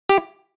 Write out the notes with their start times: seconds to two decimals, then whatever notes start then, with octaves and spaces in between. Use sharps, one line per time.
0.09 G4